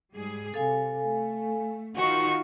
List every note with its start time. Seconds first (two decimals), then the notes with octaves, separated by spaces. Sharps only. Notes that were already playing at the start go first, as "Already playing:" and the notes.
0.14 G#2 G3 G#4
0.54 C3 A4 F5 G#5
1.05 A3
1.96 D#3 D#4 F4 F#4 C#6